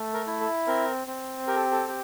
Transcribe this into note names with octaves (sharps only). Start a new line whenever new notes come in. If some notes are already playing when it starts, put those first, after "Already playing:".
Already playing: A3
A#4
E4
A4
C4 A#4
C4
G4 A#4
A4
A4
G4